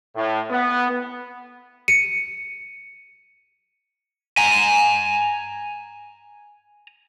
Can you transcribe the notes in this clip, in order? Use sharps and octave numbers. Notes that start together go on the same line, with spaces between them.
A2
B3
C#7 D#7
G#5 A#5